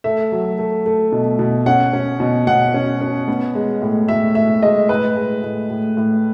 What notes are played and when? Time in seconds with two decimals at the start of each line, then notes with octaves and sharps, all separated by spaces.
0.04 A3 E5
0.32 F#3
0.59 A3
0.86 A3
1.12 B2
1.39 B2
1.66 C#4 F#5
1.93 C#4
2.20 B2
2.47 B2 F#5
2.74 C#4
3.01 C#4
3.28 B3
3.55 G#3
3.82 A2
4.08 A2 E5
4.35 A2 E5
4.63 G#3 D#5
4.89 A2 B4
5.16 G#3
5.43 A2
5.70 A2
5.97 A2